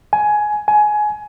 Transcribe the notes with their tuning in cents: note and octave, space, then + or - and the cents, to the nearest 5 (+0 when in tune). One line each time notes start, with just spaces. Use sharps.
G#5 +15
G#5 +20